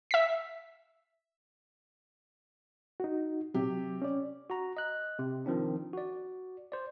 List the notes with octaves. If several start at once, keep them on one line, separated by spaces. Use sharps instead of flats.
E5 B6
D#4 F#4
C3 F#3 G4
C#4 D5
F#4 A#5
D#5 F#6
C3
D#3 F3 C4 D4
F#4 D5
C5 D5